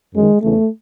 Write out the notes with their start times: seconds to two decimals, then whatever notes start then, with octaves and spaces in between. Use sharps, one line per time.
0.14 F#2 D#3 G#3
0.42 E2 C#3 E3 A3